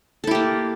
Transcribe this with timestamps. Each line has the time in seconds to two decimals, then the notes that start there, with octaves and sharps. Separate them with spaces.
0.24 A4
0.27 E4
0.31 G4
0.35 A#3